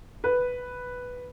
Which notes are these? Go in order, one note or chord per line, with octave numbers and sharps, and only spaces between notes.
B4